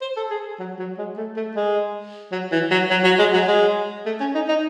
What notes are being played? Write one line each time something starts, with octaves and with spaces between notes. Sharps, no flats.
C5
A4
G#4
F#3
F#3
G#3
A3
A3
G#3
F#3
E3
F#3
F#3
F#3
G#3
F#3
G#3
A3
C#4
D#4
D#4